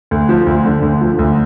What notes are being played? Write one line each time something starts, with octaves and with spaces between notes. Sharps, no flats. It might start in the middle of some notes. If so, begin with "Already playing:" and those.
D2
F3
D2
D3
D2
F3
D2